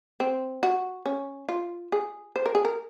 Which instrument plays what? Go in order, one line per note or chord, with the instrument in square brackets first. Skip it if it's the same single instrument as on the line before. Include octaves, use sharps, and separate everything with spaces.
[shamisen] C4
F#4
C#4
F4
G#4
C5
A#4
G#4
A#4